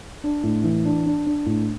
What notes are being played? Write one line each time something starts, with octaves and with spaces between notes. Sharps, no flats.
D4
A2
E3
D4
D4
D4
A2